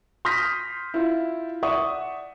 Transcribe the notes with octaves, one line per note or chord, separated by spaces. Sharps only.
C6 D#6 F6 G6 A#6 B6
E4 F4
D5 E5 F#5 C#6 D#6